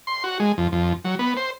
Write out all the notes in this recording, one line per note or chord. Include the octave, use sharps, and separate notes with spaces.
C6
F#4
G#3
F2
F2
F#3
B3
C5